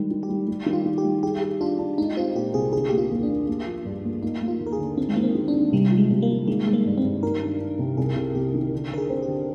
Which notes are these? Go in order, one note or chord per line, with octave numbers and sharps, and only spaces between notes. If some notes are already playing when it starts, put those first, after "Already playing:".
Already playing: D#3 G3 G#3
D#3
G4
G3
G3
D#3
F4
D#3
G4
G3
G4 G#4
G#4
D4 F4
D4
G#3 D#4
C4 F4
A#2 G4
C2 G#4
D3 G#4
A#3 G4
F4
D#2
D4
A#3
A#3
F3
G2
A#3
A#3 D#4
A#3
F4
D#2
A#4
G#4
D3
D#3 C4
G#3
D#3 A#3
C4
D#3
D4
D#3
C3 G3
F3
G#3
C3
A#3
F3
D#3 G#3
G#3
A#3
G2
C4
G2
D#3 A#4
D4
D4
C3
C2 G#4
C2
C3 G4
D#3
D3
D3 A#4
G#4
C4
G4
D3